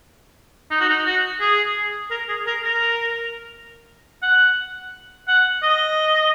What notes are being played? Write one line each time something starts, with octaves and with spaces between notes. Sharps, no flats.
D#4
F#4
D#4
F#4
G#4
A#4
G#4
A#4
A#4
F#5
F#5
D#5